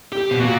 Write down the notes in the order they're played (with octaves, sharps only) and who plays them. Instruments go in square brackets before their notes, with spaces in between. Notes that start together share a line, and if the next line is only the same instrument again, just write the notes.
[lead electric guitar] G4
[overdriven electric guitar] B2
[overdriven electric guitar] A#2 [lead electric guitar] F#4